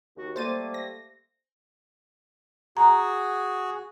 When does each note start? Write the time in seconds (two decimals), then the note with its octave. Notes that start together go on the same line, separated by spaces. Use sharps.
0.17 D#2 F#4
0.36 G3 A3 A#3 C5 A6 D#7
0.74 A#6
2.77 F#4 G#4 A#5